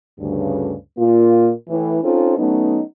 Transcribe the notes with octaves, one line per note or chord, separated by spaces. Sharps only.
D2 G2 C#3
A#2 A#3 F4
A2 E3
C4 C#4 D#4 F4 A4 C5
F#3 A3 B3 C#4 D#4